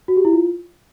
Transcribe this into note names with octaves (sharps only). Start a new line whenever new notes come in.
F#4
G4
E4
F4